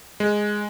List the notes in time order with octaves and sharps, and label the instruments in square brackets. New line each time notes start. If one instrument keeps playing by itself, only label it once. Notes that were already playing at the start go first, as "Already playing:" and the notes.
[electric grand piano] G#3